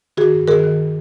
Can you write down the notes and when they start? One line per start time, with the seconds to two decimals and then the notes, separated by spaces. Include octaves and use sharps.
0.17 D#3 F#4 G#4
0.34 G2
0.47 D#3 G#4 A#4
0.63 D#3